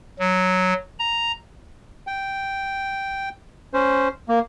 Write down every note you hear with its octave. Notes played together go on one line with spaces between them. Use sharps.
F#3
A#5
G5
C#4 C5
A#3